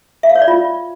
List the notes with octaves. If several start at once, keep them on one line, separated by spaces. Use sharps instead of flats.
E5
F5
C#5
D5
F4